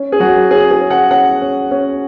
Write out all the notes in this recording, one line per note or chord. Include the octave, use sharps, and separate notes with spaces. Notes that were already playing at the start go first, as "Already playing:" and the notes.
Already playing: C#4
G#4
F#3 F#4
C#4 G#4
G#4
C#4
F#5
C#4 F#5
C#4
C#4